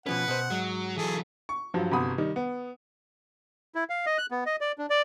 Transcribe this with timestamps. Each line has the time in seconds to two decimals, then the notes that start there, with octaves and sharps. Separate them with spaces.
0.06 B2 F3 C#4 B4 F#5
0.28 B2 C5
0.50 G#2 F#3
0.97 E3 F#3 G#4 A4
1.49 C#6
1.74 G2 F3 F#3
1.91 G1 C3 F#4 B5 D#6
2.18 D#3 G3 D#4
2.36 B3
3.75 E4
3.90 F5
4.06 D#5
4.18 F#6
4.31 B3
4.46 D#5
4.61 D5
4.78 D4
4.90 D5